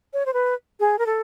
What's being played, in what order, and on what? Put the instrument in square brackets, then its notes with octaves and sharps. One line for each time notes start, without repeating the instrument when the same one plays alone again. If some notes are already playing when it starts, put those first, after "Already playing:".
[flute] C#5
C5
B4
G#4
A#4
A4